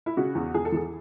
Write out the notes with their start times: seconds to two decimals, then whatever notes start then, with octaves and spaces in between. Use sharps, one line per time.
0.06 E4
0.17 C#3 F#4
0.35 E2
0.54 E2 G#4
0.65 A4
0.72 E3 G#4